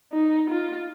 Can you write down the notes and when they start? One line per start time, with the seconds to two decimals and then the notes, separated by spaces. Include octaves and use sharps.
0.12 D#4
0.49 F4